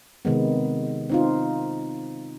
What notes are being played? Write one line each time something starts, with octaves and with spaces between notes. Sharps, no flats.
C3 D#3 G#3 B3
C4 D#4 F4